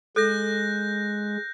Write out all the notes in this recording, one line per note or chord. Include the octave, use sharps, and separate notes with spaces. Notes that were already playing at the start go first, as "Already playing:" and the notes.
G#3 A4 F#6 G6 A#6